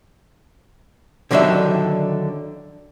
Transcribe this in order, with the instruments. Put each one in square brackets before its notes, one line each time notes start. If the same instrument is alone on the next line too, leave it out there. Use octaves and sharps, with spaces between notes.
[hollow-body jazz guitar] D3 D#3 F#3 D4 G4 E5